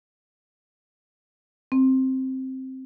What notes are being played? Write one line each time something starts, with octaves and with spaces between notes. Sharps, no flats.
C4